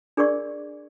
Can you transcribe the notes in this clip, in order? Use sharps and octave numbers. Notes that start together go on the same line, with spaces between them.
D4 G#4 A#4 D5 C#6